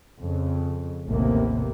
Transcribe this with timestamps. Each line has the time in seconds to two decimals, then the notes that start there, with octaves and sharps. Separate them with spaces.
0.19 F2 C#3
1.07 A1 D#2 C3 A#3 B3